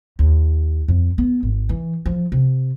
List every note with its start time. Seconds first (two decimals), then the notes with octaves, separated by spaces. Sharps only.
0.19 D#2
0.88 F2
1.18 B3
1.43 G#1
1.69 E3
2.06 F3
2.32 C3